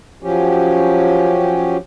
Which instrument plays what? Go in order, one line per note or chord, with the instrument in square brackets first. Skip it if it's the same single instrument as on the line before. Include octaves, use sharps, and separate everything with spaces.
[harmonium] F3 F#3 C#4 G4